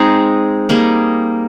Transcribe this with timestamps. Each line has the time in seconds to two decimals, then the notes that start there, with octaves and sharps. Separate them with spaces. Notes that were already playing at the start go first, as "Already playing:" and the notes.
Already playing: G#3 C4 D#4 G#4
0.69 G3 A#3 D#4 G#4